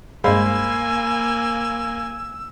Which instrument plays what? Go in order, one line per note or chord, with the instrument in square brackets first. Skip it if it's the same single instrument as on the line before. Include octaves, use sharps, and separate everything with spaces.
[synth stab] G2 G#3 [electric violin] A#3 G#5 [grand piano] C5 F5 B5 [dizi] E6